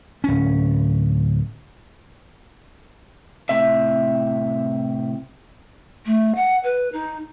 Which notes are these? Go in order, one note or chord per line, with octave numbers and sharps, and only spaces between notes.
D1 C#4
A2 C3 E5
A3
F#5
B4
D#4